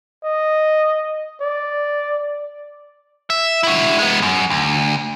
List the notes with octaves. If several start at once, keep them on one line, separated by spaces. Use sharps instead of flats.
D#5
D5
E5
E4 F#4
G#3 B3
F#2
D2